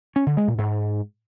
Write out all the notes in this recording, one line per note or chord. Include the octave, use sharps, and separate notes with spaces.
C#4
D3
G#3
A#2
G#2